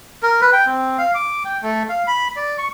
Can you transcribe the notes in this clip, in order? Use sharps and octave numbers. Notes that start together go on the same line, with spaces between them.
A#4
B4
G5
C4
F5
D6
G5
A3
F5
B5
D5
C#6